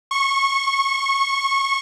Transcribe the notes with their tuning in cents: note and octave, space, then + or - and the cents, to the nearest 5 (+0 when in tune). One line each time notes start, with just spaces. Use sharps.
C#6 -20